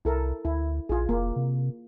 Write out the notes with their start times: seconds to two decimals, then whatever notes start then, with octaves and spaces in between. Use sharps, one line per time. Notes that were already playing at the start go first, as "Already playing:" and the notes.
0.05 C2 E4 A4 A#4
0.45 D2 E4
0.89 A#1 F4 G#4
1.09 F1 A#3
1.36 C3